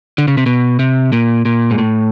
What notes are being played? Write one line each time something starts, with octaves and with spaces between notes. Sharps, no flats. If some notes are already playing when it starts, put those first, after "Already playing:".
D3
C#3
C3
B2
C3
A#2
A#2
G#2
A2